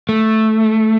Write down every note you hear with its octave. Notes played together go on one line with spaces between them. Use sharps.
A3